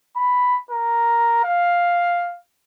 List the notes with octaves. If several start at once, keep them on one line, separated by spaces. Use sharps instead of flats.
B5
A#4
F5